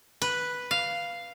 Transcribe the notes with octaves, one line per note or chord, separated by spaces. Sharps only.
B4
F5